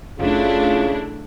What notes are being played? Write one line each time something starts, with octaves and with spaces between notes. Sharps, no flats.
F#1 C#3 A3 D4 E4 F4